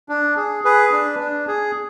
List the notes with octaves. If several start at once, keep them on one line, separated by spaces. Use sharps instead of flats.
D4
G#4
G#4 B4
D4
D4
G#4